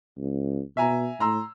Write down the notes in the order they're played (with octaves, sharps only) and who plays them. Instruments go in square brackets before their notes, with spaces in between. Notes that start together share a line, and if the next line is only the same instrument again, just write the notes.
[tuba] C#2
[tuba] B2 [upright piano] E5 G#5 A#5
[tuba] A2 [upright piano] A#5 C6 E6